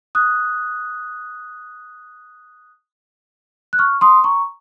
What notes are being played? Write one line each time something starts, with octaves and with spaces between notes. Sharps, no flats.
D#6 F#6
F#6
C#6 F6
C6 D#6
A#5 C#6